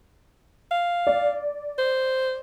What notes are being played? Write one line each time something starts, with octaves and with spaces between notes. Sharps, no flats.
F5
D5
C5